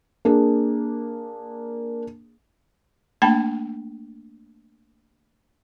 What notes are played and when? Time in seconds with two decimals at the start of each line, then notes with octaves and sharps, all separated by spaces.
0.25 A#3 D4 G#4
3.22 A3 A#3 D4 G5 A5 B5